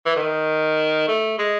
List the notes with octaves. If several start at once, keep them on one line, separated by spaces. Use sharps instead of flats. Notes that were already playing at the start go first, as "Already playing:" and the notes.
E3
D#3
A3
G#3